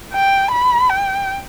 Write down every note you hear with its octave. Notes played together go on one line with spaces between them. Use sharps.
G5
B5
G5